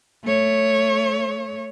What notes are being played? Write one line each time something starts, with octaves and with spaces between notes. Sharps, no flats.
A3 C#5